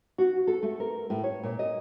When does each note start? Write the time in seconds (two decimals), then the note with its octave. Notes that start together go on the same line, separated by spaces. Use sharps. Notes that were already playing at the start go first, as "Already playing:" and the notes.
0.18 F#4
0.47 A4
0.63 A3
0.80 A#4
1.10 A2
1.24 C#5
1.43 A#2
1.59 D#5